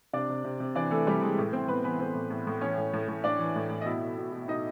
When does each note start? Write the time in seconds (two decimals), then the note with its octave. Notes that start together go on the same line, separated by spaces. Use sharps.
0.13 C3 D4 D5
0.30 C3
0.45 C3
0.60 C3
0.75 E3 D4 D5
0.90 E3 A3 A4
1.07 C3 G3 G4
1.22 E3 G#3 G#4
1.38 A2
1.53 A2 C4 C5
1.68 A2 B3 B4
1.84 E3 B3 B4
1.99 A2 C4 C5
2.15 A2
2.30 A2
2.47 A2
2.61 E3 C#4 C#5
2.78 A2
2.94 A2
3.08 A2
3.24 A2 D4 D5
3.39 E3
3.56 A2
3.70 A2
3.82 D#5
3.86 B2 E4 E5
4.02 B2
4.18 B2
4.33 B2
4.48 B2 D#4 D#5